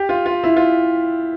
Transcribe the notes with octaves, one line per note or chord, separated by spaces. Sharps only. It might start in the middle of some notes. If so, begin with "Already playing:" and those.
Already playing: G4
F4
F4
E4
F4